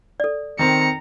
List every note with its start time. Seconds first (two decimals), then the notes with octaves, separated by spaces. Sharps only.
0.20 A4 D5
0.59 D#3 C4 A#5 C#7